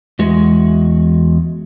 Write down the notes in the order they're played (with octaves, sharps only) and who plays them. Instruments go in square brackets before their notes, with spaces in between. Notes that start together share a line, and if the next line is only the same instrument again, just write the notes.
[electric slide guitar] E2 G#3 F#4